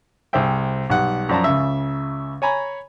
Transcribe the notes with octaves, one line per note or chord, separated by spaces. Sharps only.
C2 G#4 C5 E5 G5
B1 G3 F#5
F#2 F3 D5 A5 A#5
C#2 C#3 E5
C#5 G#5 A#5 B5